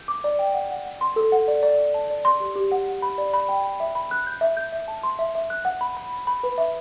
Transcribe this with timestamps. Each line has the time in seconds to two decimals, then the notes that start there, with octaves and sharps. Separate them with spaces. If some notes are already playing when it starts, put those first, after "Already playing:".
Already playing: G6
0.08 D6
0.24 D5
0.39 G5
0.54 F#5
0.71 F#5
0.85 F#5
1.01 C6
1.16 A4
1.32 F#5
1.48 D5
1.63 D5
1.78 D5
1.94 A5
2.10 D5
2.25 C6
2.40 G4
2.56 G4
2.72 F#5
2.88 F#5
3.02 B5
3.18 D5
3.34 B5
3.49 G5
3.64 B5
3.80 E5
3.95 B5
4.11 F#6
4.27 G6
4.41 E5
4.57 G6
4.72 E5
4.88 A5
5.03 C6
5.19 E5
5.35 E5
5.50 F#6
5.65 F#5
5.81 B5
5.97 B5
6.12 B5
6.27 B5
6.43 B4
6.58 E5